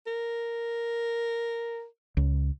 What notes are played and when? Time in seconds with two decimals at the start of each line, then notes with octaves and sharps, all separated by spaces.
0.06 A#4
2.17 C#2